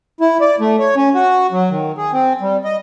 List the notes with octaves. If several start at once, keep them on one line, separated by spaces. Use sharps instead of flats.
E4
D5
A3
C#5
C#4
F#4
F#3
D#3
G#4
C4
G3
D#5